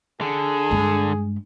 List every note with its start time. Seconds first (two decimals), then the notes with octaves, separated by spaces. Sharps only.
0.21 D3 G#4
0.71 G2 G#3